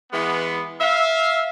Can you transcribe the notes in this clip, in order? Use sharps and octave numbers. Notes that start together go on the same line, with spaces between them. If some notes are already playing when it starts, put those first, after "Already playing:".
E3 G#3 B3
E5 F5